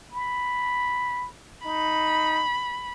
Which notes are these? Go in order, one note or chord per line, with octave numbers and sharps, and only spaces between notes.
B5
D#4 B5